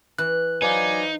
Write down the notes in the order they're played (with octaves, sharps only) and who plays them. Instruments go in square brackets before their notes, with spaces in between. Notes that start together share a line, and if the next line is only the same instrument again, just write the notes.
[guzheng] E3 [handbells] F#6
[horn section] F#3 D5 G#5 [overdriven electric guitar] D#4 [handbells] B4 C5 F5